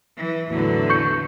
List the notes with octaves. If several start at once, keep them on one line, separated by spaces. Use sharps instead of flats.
E3
E2 A2 D3 E3 F#3
C#6 G6 C#7